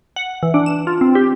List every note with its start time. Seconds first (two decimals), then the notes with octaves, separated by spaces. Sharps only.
0.16 F#5
0.43 E3
0.54 D4
0.66 E7
0.87 F4
1.01 C4
1.15 G4